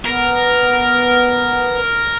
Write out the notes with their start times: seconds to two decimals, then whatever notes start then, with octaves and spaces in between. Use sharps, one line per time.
0.05 B3 A#4